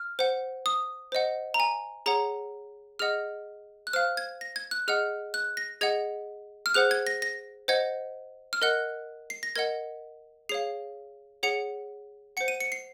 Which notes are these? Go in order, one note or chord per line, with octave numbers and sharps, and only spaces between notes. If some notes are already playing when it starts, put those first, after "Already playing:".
Already playing: F6
C5 F#5
D#6
C5 D#5 F#5
A#5
G#5
G#4 C#5 F#5 A#5
G#4 D#5 F#5 F6
F#6
C5 F5 F6
G#6
A#6
G#6
F#6
G#4 D#5 F#5 F6
F#6
A#6
G#4 D#5 F#5 G#6
F6
G#4 C5 F#5 F#6
G#6
A#6
A#6
C5 D#5 F#5 G#6
F6
A#4 D#5 F#5 F#6
C7
A#6
A#4 D#5 F#5 G#6
G#4 C#5 F5 C7
G#4 C#5 F#5 C#7
C5 F#5 C#7
D#7
C#7
C7